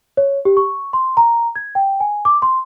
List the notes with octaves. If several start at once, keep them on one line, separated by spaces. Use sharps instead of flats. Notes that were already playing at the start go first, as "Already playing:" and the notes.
C#5
G4
C#6
C6
A#5
G#6
G5
G#5
D6
C6